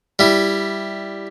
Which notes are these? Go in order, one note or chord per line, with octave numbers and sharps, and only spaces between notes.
G3 E4